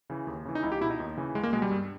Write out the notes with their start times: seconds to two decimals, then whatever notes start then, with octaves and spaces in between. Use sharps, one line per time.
0.10 C#3 E3
0.27 D#2
0.45 C#3 E3
0.55 D#4
0.63 C#2 E4
0.72 G4
0.81 B2 E4
0.90 D#4
1.00 D#2
1.17 C#3 E3
1.35 C#2 G#3
1.43 A#3
1.53 B2 G#3
1.62 G3
1.71 G2